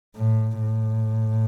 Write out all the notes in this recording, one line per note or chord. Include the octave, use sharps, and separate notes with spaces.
A2
A2